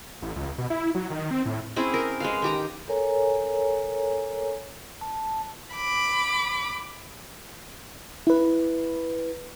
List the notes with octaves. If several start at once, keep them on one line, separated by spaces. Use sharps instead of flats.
A1
C#2
B2
E4
F#3
D#3
C4
A2
C4 C#4 E4 G#4
A#4
G#3 B4 F5
D#3 G4 A#5
A4 A#4 C#5 G#5 A#5
A5
B5 D6
E4 B4